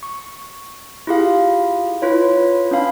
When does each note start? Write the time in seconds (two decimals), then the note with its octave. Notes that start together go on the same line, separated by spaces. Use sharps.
0.03 C#6
1.07 E4 F4 G4 G#4 F5
2.02 E4 F4 B4 C#5
2.71 C#4 D4 F5 B5